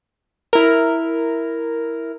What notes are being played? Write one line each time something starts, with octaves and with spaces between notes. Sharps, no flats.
E4 A#4